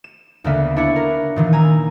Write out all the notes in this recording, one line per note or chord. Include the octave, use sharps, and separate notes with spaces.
E7
D2 C#3 A#3 B3 E5 F5
D4 E4 C#5 E5 F#5
A#4
A#2 D#3 E3
G#5 A#5 E6